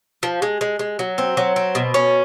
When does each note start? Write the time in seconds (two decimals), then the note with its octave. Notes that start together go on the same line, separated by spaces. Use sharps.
0.23 F3
0.42 G#3
0.61 G#3
0.79 G#3
0.99 F#3
1.18 C4
1.37 F#3
1.56 C4
1.75 B2
1.94 C#4